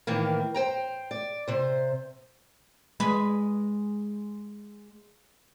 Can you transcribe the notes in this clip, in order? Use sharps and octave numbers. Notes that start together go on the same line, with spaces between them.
A2 D#3 E3 A#3
C5 G5 A#5
D5
C3 C5
G#3 B4